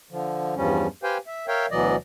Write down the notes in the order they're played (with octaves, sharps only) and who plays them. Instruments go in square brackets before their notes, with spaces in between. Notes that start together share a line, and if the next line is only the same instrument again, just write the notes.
[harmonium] D3 F3
E2 G2 F3 G3 C#4
G4 B4 C5 F5 G5 G#5
E5
A#4 C#5 E5 F5 G5
D2 B2 E3 F#3 D5 D#5